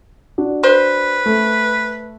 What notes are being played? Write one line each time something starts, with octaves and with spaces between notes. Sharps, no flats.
D4 F#4
B4 C5
A3